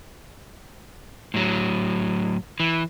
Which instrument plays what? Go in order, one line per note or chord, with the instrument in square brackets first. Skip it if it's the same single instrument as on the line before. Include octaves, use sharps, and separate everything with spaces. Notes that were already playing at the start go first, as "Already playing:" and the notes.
[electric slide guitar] A2 F#3
E3